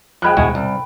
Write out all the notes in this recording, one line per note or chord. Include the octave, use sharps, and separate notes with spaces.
F3 G#3 G5 B5 F#6
D#2 G#2 B2 G#3 E4 F#4
C2